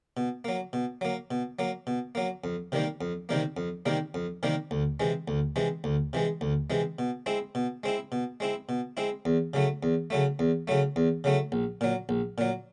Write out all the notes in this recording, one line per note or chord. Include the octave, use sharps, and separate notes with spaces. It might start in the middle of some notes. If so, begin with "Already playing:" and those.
B2
F#3 A#3
B2
F#3 A#3
B2
F#3 A#3
B2
F#3 A#3
F2
C3 D#3 G3 A#3
F2
C3 D#3 G3 A#3
F2
C3 D#3 G3 A#3
F2
C3 D#3 G3 A#3
D2
C3 E3 G#3
D2
C3 E3 G#3
D2
C3 E3 G#3
D2
C3 E3 G#3
B2
G#3 C4 E4
B2
G#3 C4 E4
B2
G#3 C4 E4
B2
G#3 C4 E4
E2
C#3 F#3 A3
E2
C#3 F#3 A3
E2
C#3 F#3 A3
E2
C#3 F#3 A3
A#1
A#2 F#3
A#1
A#2 F#3